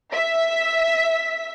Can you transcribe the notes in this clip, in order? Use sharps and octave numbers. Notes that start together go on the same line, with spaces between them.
E5 B6